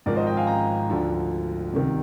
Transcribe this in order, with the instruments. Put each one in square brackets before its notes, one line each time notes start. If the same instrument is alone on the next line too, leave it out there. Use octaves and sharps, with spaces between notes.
[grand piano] G#1 G#2 F3 A#4 D5
C5 D#5
D#5 G5
F5 G#5
G5 A#5
D2 D3 F3
C2 C3 D#3